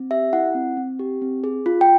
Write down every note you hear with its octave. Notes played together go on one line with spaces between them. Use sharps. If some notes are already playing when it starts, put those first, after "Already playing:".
Already playing: C4
G4 E5
E4 F#5
C4
C4
G4
C4
G#4
F4
G5